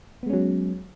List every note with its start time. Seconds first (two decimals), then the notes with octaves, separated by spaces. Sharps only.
0.23 B3
0.26 G#3
0.30 C#4
0.33 F#3